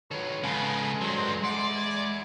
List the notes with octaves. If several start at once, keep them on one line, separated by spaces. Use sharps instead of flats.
D#3 F#3 A4 B4 C#5
C#3 G#3 B3 A5
G2 F#3 C5
E4 D5 F#5 C6
G#6